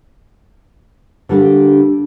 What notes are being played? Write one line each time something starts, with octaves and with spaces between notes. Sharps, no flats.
D3 G3 A#3 D4